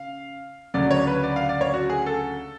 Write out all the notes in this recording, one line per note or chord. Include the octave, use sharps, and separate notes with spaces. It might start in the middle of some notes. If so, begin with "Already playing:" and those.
Already playing: C#3 F5
D2 C#3 F#3 D5
C#5
B4
D5
F5
D5
C#5
F#4
G#4
A4